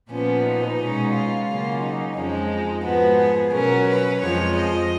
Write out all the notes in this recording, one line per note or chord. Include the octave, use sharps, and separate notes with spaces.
A#2 F3 B3 C#4
D#4
B2 G#3 C#4
F4
C#3 F#3 A#3 C#4
D#4
F2 F3 G#3 C#4
D#4
G#2 F3 B3 F#4
G#4
B2 F#3 C#4 A#4
B4
F2 F3 G#3 C#5
D#5